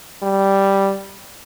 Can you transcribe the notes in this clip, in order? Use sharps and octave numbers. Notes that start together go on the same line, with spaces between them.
G3